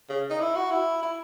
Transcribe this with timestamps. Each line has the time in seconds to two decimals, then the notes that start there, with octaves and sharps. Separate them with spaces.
0.09 C#3
0.30 D#4
0.40 E4
0.56 F#4
0.71 E4
1.02 E4